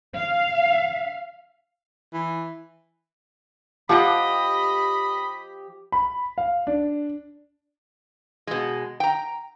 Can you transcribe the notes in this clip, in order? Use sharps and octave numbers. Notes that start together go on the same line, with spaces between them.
F5
E3
F3 G4 D#5 F#5 B5
B5
F5
D4
B2 G#3
G5 A#5